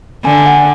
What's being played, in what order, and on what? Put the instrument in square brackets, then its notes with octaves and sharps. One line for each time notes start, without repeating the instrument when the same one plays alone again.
[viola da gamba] D3 [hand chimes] G#5
[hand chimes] F#5